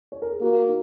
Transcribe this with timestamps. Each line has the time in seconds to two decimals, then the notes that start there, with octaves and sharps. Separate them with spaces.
0.12 C#5
0.22 A#4
0.31 G#4
0.41 A#3 F#4
0.67 D#4